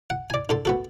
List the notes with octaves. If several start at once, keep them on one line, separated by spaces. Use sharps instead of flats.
F#5
D5 G#5
D3 A4 C6
B3 F#4 A4